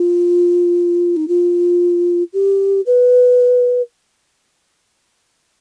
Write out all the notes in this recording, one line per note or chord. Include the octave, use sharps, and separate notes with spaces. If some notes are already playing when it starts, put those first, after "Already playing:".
Already playing: F4
D#4
F4
G4
B4